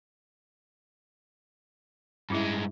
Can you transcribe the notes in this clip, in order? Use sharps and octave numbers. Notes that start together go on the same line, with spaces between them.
G2 G#3 C#4 E4 E5